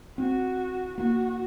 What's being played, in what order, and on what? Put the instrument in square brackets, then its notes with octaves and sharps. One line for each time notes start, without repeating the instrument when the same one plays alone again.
[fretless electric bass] C4 [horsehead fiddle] F#4
[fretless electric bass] A#3 [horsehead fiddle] F#4